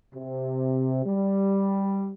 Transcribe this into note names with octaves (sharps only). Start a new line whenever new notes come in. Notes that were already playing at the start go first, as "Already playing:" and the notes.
C3
G3